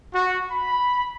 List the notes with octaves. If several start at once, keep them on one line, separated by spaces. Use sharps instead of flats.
F#4
B5